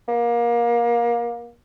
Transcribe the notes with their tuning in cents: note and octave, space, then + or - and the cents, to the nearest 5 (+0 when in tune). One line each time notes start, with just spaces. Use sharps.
A#3 +25